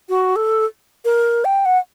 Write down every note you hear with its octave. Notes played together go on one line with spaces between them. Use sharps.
F#4
A4
A#4
G5
F#5